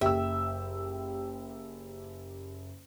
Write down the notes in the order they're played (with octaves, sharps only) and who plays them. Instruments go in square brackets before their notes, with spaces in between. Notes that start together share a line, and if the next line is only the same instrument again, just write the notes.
[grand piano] F#1 [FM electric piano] G4 [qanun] E5 [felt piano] G5 E6